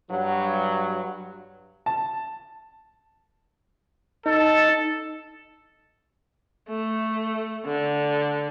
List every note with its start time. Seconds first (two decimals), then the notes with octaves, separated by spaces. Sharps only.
0.10 G2 F#3
1.86 A5
4.26 D#4 A4
6.69 A3
7.66 D3